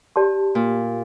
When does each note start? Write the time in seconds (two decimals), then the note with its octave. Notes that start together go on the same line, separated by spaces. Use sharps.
0.16 G4 D5 A5 C6
0.55 A#2